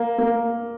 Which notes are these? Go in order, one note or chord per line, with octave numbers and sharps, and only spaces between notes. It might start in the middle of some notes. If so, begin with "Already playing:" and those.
Already playing: A#3
A#3